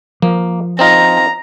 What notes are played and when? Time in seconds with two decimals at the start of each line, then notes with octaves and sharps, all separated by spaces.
0.22 F3 A#3
0.79 C4 D#4 F4 A#5